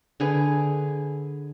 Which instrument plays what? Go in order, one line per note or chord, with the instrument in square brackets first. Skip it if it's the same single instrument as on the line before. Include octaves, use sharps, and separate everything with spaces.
[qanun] D3 G#4 B4